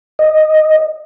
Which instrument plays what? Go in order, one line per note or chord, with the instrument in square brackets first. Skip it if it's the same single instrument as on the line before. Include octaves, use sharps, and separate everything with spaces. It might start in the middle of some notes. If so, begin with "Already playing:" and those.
[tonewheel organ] D#5